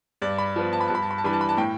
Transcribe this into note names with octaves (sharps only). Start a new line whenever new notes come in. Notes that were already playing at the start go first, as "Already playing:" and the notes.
G2 D5
B5
F3 B3
A5
B5
G2 A5
B5
A5
B5
A5
E3 G3 D4 B5
A5
B5
A5
A2 G5